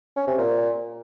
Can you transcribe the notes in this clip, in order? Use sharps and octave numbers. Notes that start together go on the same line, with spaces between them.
C#4
C3
A#2